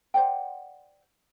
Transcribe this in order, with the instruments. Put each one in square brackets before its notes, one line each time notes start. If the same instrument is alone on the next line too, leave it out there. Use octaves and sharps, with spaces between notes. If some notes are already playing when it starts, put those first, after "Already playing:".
[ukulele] C5 D5 F#5 G5